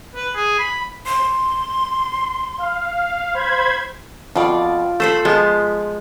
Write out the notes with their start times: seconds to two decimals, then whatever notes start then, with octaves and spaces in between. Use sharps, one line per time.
0.15 B4
0.35 G#4
0.59 B5
1.06 C6
2.58 F5
3.34 C5 B5 G#6
4.36 F2 B2 F4 D5
5.00 A3 A4 C5 B5
5.25 F3 G#3 B3 E5